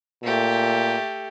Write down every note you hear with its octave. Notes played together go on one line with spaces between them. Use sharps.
A#2 A3 G4